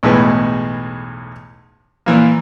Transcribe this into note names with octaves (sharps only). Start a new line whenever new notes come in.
B1 E2 A2 G#3 B4
A#2 E3 A#3